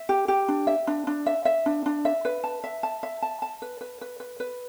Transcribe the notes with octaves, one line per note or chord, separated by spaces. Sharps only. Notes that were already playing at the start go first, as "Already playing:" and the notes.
Already playing: E5
G4
G4
D4
E5
D4
D4
E5
E5
D4
D4
E5
B4
A5
E5
A5
E5
A5
A5
B4
B4
B4
B4
B4